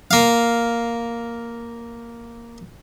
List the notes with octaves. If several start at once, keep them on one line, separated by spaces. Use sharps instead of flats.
A#3 F5